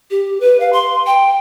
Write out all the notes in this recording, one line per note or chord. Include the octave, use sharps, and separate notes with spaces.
G4
B4
F5
C6
G5